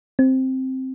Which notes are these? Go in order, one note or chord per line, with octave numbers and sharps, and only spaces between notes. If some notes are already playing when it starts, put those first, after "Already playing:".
C4